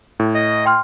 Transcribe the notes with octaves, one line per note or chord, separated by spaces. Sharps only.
A2
D#5
G5 C6 F6